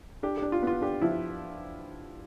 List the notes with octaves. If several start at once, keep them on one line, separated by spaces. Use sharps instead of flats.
D4 G4
D4 G4
F4
B3 F4
D4 G4
F3 E4